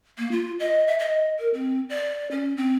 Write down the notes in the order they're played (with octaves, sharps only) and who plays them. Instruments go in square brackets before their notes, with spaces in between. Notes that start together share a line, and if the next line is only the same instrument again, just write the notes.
[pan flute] A#3
F4
D#5
E5
D#5
A#4
C4
D5
C#4
C4